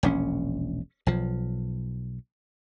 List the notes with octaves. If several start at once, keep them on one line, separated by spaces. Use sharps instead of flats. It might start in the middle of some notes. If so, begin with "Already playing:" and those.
E1 A#1 C#4
B1 F3